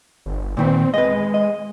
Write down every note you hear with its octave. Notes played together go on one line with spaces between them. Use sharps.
G1
A#2 D#3 B3 C4
G#3 B4 D#5
D#5